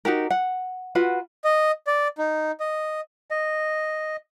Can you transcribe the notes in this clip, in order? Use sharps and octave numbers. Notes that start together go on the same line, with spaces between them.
D#4 F#4 G4 A#4
F#5
F4 F#4 B4 F#5
D#5
D5
D#4
D#5
D#5